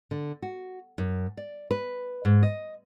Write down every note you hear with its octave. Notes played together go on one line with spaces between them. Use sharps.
D3
F#4
F#2
D5
B4
G#2
D#5